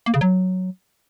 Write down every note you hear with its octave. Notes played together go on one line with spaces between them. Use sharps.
A#3
C#3
F#3